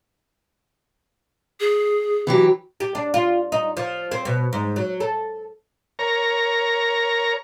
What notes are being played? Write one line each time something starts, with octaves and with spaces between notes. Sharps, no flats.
G#4
E3 F#3 G4
G4
D4
F4
D#4
F3
C4
B2
G#2
F#3
A4
A#4 C#5 A#5